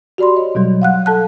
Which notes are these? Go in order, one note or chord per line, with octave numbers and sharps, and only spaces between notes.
F#4 G4 D5 B5 C6
C#5 D#5
B2 F#3 G3
F5 F#5 F#6
A4 A5 F#6